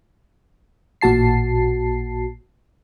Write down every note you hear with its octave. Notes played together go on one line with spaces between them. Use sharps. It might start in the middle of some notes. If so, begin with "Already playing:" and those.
A1 A#2 F#4 A5 C7